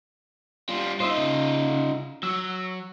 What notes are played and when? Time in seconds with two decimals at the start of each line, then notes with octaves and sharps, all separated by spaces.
0.69 G3 F4
1.00 D#4 F4 C5 D#5 E5
1.17 C#3
2.23 F#3 E6